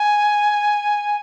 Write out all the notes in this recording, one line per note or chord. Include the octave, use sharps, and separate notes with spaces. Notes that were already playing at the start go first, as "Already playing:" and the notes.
Already playing: G#5